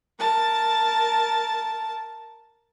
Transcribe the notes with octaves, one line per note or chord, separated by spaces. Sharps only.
A#4 A5